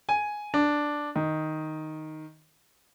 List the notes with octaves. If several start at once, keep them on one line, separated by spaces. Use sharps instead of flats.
G#5
D4
D#3